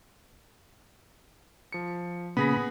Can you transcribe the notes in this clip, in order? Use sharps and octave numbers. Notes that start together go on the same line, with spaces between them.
F3 C#7
A#2 C#3 B3 G#4 B5 A#6